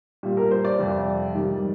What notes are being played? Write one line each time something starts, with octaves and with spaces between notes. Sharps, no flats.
A#2 G3
A#4
C5
D5
F2 C3 G3
G#2 D#3 G3